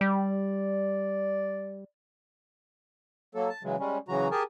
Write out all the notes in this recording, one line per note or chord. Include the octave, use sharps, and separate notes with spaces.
G3 D5
F#3 A#3 A4
A5
C#3 E3 F#3 G#3
G3 G#3 C#4
C#3 E3 F#3 F#4 A#5
G4 G#4 A#4 G#5 A5